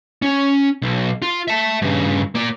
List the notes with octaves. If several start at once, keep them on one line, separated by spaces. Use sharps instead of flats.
C#4
B1
F4
E5 A5
G2 C#3
A#3 D5